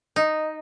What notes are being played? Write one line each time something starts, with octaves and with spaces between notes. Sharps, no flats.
D#4